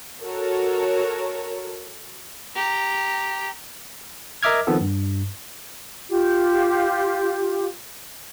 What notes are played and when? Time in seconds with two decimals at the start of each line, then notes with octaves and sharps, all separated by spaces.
0.23 F#4 A4 A#4 C#5
2.55 G4 A#5
4.43 A#4 D#5 E5 D6 F6 G#6
4.67 D#3 F3 B3 C4 A4
4.81 G2
6.09 F4 G4